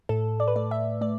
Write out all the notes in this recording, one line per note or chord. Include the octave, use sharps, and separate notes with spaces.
A2 A4
D5
B4
A3 D5
E5
A3 D5